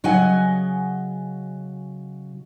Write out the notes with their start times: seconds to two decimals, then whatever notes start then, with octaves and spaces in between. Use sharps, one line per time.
0.04 C#3 F#3 D#5 F#5 G#5